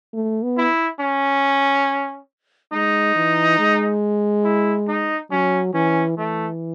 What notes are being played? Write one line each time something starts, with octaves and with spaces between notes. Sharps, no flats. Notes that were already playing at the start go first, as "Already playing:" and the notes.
A3
B3
E4
C#4
G#3 D#4
E3
G#3
E4
D#4
F#3 C#4
E3 C#4
E3 A3